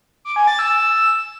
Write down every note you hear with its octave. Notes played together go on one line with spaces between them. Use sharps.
D6
G#5
A6
E6